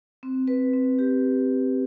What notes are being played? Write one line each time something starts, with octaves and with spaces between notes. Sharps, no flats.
C4
B4
C4
G4